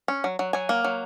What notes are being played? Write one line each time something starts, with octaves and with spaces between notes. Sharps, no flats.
C#4
F#3
F#3
F#3 G#5
A#3
F#3